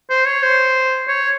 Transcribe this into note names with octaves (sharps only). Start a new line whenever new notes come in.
C5
C#5
C5
C#5